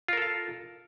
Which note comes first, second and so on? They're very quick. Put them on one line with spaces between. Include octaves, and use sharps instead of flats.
F4 A#4 A4 F5